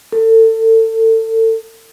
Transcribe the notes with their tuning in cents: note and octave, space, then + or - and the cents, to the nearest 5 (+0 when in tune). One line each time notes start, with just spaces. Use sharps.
A4 +30